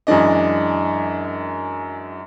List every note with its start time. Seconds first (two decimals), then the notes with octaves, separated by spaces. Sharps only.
0.07 F#2 E3 G#3 D4 D#5